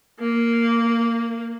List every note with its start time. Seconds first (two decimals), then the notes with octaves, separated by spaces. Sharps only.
0.20 A#3